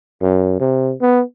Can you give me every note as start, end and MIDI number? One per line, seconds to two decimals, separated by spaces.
0.22 0.56 42
0.60 0.94 48
1.01 1.22 59